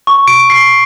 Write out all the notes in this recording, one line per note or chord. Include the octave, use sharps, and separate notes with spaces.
C#6
D7
C7